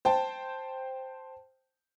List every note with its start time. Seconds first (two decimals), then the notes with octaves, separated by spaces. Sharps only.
0.05 C5 G5 A5